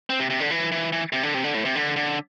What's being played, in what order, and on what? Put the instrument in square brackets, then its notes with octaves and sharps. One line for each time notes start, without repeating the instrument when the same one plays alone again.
[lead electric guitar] C4
C3
C3
D3
E3
E3
E3
C3
D3
C3
D3
A2
C3
D3
D3